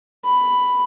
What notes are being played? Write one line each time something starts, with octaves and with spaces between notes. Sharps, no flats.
B5